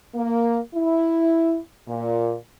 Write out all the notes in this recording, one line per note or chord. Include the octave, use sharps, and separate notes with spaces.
A#3
E4
A#2